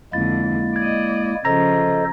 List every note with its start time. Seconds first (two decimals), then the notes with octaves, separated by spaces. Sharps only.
0.13 F2 D3 G#3 A#3 E4 A6
0.76 D5 D#5 G#6
1.45 C#3 F3 A4 C5 D#5 A#5 A#6